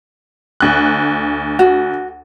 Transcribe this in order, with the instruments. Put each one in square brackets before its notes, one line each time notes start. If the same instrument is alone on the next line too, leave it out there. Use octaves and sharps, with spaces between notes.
[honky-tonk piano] D2 F#6
[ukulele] F#4